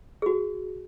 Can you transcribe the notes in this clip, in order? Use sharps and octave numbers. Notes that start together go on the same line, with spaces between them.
F#4 G#4